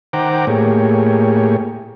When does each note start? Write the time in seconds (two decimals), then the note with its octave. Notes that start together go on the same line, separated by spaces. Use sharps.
0.13 D#3 C5 F#5 G5 A#5 D6
0.47 A2 A#3 G4 G#4 C#5